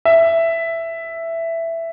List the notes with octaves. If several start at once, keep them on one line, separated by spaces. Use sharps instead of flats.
E5